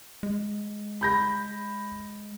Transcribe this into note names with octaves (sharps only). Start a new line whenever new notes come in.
G#3
B5 G6 A#6